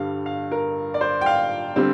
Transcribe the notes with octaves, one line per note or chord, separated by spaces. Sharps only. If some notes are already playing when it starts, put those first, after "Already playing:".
Already playing: G2 D3 G3 F5
F5
A#4
D5
C5
G5
F5
D3 G3 C4